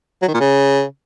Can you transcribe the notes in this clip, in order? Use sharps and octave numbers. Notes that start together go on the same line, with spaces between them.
F#3
D#3
A#2
C#3